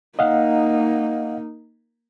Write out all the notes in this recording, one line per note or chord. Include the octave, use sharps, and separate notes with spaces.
A#3 D#4 D#5 F5 F#5